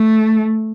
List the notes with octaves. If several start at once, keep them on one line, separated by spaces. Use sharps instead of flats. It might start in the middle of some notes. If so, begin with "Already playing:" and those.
Already playing: A3